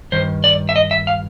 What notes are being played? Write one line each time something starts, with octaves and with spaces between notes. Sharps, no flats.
G2 D#3 C5
D5
E5
D#5
E5
F5